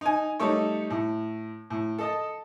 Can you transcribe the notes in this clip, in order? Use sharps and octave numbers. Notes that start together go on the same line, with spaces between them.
D#4 G#5
G3 A3 D#4 A4 C#5
A2
A2
A4 D#5 A5